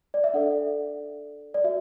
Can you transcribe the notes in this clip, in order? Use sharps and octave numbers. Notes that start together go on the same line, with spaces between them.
D5
E5
D4 A4 D5 F#5
D5
F#4 E5